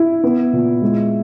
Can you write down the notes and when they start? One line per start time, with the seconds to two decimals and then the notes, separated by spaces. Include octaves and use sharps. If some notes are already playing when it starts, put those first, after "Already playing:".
Already playing: E4
0.24 B3
0.53 A#2
0.82 G#3